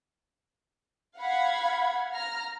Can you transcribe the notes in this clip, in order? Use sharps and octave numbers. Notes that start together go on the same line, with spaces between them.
F5 F#5 B5 G#6
A#5 F6